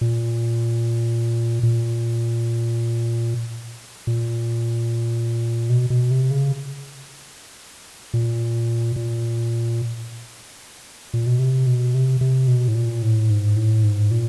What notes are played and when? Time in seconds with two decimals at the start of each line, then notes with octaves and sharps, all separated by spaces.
0.01 A#2
1.63 A#2
4.07 A#2
5.70 B2
5.90 B2
6.11 C3
6.31 C#3
8.14 A#2
8.96 A#2
11.14 A#2
11.26 B2
11.39 C3
11.67 B2
11.95 C3
12.21 C3
12.48 B2
12.68 A2
12.75 A#2
13.02 A2
13.30 G#2
13.56 A2
13.84 G#2
14.11 A#2